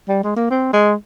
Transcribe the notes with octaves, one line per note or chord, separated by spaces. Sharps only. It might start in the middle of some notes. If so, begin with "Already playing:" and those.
G3
G#3
A#3
C4
G#3